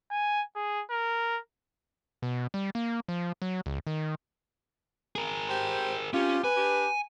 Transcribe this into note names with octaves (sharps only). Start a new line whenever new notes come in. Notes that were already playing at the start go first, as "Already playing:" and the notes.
G#5
G#4
A#4
B2
G3
A#3
F3
F#3
C#2
D#3
G#4 A#4
G4 C5
C3 C#4 F4 G4
B4 G#5
D4 G4